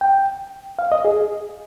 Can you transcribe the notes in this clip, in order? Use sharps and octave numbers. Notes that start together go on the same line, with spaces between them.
G5
F5
D#5
G#4